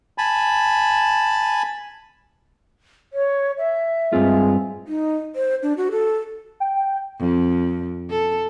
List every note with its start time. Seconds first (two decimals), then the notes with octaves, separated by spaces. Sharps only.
0.18 G#5 A5 B5
3.13 C#5
3.58 E5
4.13 G2 G#3 C4 F4
4.88 D#4
5.36 C5
5.63 D4
5.77 F#4
5.91 A4
6.60 G5
7.20 F2
8.10 A4